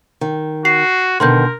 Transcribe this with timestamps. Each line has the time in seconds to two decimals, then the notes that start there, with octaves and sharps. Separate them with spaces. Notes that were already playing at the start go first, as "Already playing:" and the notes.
0.21 D#3
0.65 F#4 C7
1.20 B2 D3 D#3 A#4 C6 G6